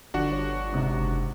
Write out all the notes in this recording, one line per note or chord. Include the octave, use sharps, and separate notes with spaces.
G1 F3 D4 F#4 F#5
C#5
G#2 C3
F#1